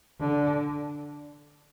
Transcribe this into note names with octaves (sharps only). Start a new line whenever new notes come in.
D3